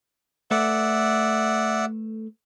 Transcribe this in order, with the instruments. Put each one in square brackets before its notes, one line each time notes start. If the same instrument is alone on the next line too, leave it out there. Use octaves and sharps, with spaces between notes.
[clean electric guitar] A3 A4 B4 [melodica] D5 E5 F#5